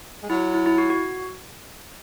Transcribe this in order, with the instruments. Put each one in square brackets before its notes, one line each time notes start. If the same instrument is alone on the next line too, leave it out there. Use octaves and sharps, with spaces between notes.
[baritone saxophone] G#3
[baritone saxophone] F#3 [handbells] E4
[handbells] E4
E4
F#4
F#4